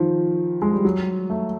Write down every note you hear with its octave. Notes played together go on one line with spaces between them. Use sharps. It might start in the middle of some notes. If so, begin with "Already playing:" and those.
Already playing: D#3 F3
G#3
G3
F#3
A3